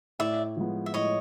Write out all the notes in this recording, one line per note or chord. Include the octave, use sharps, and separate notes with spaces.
A2 D5 E5
F3 G#3 B3
E5
A2 C#5 D#5